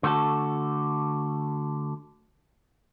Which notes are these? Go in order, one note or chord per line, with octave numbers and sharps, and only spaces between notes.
D3 A3 F#4 A4